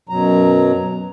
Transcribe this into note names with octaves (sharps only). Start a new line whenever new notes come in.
F#2 B2 F#3 A#5